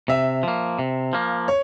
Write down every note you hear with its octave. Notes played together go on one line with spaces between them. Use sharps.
C3 E5
F3 A#3
C3
F3 A#3
C#5